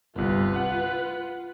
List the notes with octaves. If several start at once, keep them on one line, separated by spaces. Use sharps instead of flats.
G1 C2 F4 B4
F#5